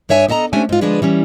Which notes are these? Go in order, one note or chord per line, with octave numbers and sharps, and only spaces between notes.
G2 D4 C#5 E5 G#5
B3 A4 D#5 A5 A#5
A3 C#4 D4 G4 C5 G#5
G#2 F4
D3 F3 G#3 D4 G#4 B4
E3 G3 C#4